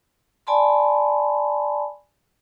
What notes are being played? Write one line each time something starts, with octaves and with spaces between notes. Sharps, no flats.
D5 G#5 A5 B5 C6